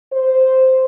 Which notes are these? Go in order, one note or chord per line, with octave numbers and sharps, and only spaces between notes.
C5